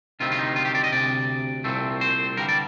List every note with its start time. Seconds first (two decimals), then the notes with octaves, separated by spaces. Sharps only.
0.20 D2 C3 D#3 G3 C4 F4
0.32 F4
0.39 D#4
0.56 F4
0.65 G4
0.75 D5
0.84 D#5
0.92 D2 C3 D5
1.64 C2 A#2 A3 C4
2.01 C5
2.37 G2 D3 G3 A#4
2.49 D5